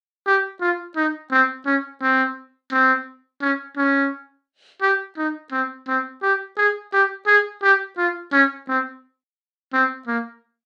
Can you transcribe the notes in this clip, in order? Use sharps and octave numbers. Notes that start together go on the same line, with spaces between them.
G4
F4
D#4
C4
C#4
C4
C4
C#4
C#4
G4
D#4
C4
C4
G4
G#4
G4
G#4
G4
F4
C#4
C4
C4
A#3